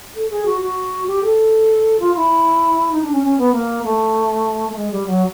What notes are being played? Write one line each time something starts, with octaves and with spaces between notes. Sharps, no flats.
A4
G#4
F#4
F#4
G4
A4
F4
E4
D#4
D4
C#4
C#4
B3
A#3
A3
A3
G#3
G3
F#3